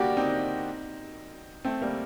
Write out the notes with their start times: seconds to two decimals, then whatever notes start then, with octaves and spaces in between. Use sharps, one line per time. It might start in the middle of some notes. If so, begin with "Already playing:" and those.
Already playing: G3 A#3 D4 F#4 G4
0.17 C4 D#4
1.65 A3 C4
1.82 G3 A#3